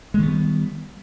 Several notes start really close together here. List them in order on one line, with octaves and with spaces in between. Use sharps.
G#3 D#3 B3 G3